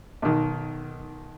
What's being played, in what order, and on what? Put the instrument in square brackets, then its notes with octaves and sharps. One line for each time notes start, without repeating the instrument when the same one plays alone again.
[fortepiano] B1 D#3